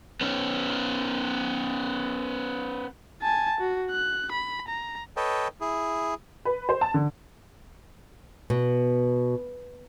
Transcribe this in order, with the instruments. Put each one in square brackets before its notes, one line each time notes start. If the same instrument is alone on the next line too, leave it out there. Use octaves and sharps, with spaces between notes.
[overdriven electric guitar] B3 C#4
[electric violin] G#5 A5
F#4
F#6
B5
A#5
[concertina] A4 B4 C#5 D#5 G5
E4 G#4
[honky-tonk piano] B4
C5
A5
D3
[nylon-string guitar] B2